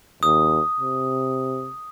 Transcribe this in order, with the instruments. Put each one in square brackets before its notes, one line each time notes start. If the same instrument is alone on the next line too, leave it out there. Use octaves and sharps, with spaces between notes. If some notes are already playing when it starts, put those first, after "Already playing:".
[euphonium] D#2 [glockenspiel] D#6
[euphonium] C3